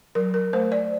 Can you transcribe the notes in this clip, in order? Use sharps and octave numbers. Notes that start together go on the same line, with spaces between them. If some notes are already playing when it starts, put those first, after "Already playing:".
F#3 A#4
A#4
A3 C5
D5